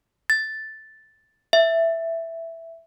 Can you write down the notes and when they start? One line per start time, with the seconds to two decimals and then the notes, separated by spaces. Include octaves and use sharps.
0.30 A6
1.53 E5